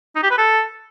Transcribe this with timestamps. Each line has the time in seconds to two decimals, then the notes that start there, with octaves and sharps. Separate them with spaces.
0.15 D#4
0.23 G4
0.30 B4
0.38 A4